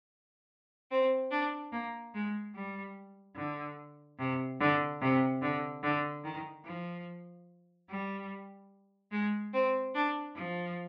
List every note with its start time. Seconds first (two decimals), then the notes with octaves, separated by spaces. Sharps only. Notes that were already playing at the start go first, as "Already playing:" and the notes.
0.91 C4
1.31 D4
1.72 A#3
2.14 G#3
2.55 G3
3.37 D3
4.19 C3
4.60 D3
5.01 C3
5.42 D3
5.83 D3
6.24 D#3
6.66 F3
7.89 G3
9.12 G#3
9.54 C4
9.95 D4
10.36 F3